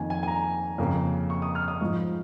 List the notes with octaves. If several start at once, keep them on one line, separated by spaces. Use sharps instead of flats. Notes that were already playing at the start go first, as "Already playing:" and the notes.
Already playing: F2 D#3 A#3 G#5
G#5
G#5
A#5
F2 C#3 A#3
C#6
D#6
F6
D#6
G#2 F3 G#3 C#6